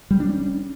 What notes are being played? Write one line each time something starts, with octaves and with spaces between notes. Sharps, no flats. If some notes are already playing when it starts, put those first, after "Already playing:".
G3
D4
C#4